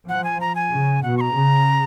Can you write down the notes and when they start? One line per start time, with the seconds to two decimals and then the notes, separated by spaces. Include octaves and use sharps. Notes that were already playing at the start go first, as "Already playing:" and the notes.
0.09 F3 F#5
0.24 G#5
0.41 A#5
0.55 G#5
0.71 C#3
1.03 B2 F#5
1.17 C#6
1.21 A#5
1.34 C#3